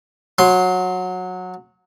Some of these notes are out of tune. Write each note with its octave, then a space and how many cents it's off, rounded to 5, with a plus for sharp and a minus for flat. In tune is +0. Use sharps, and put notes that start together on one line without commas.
F#3 -15 C6 +5